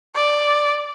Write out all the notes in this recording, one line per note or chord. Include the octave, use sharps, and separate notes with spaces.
D5